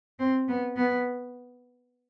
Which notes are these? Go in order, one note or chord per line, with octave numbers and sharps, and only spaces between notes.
C4
B3
B3